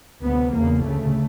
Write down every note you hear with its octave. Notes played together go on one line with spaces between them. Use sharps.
D2 B3
C3
E2 C#3 A#3
D2 C#3 A3